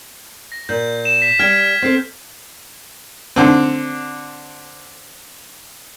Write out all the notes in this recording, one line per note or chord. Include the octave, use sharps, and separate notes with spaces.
A#6
A#2 G6
E7
B6
G3 G5 F6 G#6 B6
C4 A4
D3 C4